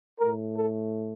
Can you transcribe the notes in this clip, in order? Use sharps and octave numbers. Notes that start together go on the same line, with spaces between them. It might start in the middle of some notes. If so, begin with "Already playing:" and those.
A2 A3 A#4
A4